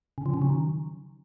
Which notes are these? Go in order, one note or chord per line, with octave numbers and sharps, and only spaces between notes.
C#3
F3
C#3
F#3
D#3